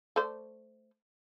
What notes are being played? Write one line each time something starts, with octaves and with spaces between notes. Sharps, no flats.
A3 C5 D5